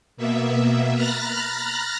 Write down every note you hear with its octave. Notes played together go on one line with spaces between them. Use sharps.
B2 A#3 B3 E5
A#5 B5 F6 F#6 A6 A#6